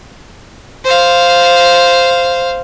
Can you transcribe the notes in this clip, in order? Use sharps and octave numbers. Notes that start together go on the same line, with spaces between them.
C5 F5